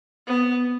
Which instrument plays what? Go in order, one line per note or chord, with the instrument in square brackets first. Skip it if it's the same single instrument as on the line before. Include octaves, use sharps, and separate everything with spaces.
[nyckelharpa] B3